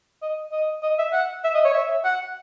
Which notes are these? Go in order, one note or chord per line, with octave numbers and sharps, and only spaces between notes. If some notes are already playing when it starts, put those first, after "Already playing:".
D#5
D#5
D#5
E5
F#5
E5
D#5
C#5
E5
F#5